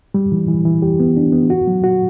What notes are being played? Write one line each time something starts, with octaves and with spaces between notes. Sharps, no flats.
G3
E3
E3
E3
G4
B3
D4
B3
F#4
F#3
F#4